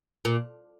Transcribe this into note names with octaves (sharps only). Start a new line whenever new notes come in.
A#2